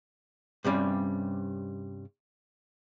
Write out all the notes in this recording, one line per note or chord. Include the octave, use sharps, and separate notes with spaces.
G2 C3 G3 C#4